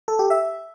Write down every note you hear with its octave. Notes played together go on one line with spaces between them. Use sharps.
A4
G4
E5